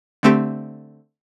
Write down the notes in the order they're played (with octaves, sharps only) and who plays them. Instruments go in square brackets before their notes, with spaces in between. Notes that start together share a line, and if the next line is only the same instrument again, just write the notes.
[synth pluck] D3 A3 C4 G4